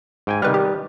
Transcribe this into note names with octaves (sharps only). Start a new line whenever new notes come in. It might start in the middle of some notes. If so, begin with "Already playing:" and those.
G#2 G5 G#5
C3 D#3 G3 B4 F6
G4